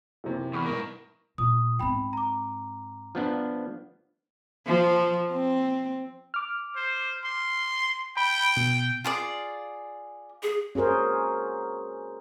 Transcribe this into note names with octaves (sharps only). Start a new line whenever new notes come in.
F#2 C3 E3 E4 F#4 C5
E2 B5 C#6 F6
G#2 B2 E4 A#4
A#2 D#6
G#2 C4 G5 B5
A#5 D6
F3 B3 D4
F3
C4
D6 F6
C5
C6
G5 B5
B2
F4 G#4 D5
G#4
C#4 F#4 G#4 A#4 C5